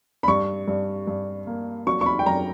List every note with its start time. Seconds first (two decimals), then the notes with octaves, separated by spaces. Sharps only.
0.23 B5
0.28 G2 C#6
0.68 G2
1.07 G2
1.47 A#3
1.87 F#3 C#6
2.01 C#6
2.06 B5
2.19 G5
2.26 F#2 A#5